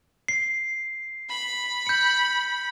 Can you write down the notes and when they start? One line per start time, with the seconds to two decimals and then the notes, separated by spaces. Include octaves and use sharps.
0.28 C7
1.30 B5
1.87 G6 C#7